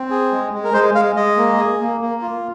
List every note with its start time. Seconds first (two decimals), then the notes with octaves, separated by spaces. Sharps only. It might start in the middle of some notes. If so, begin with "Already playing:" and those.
Already playing: C4
0.10 G#4
0.32 G#3
0.53 G#3
0.64 A#4
0.74 G#3 C5
0.94 G#3 F5
1.16 G#3 D#5
1.37 A#3
1.58 G#4
1.79 A#3
2.01 A#3
2.22 F4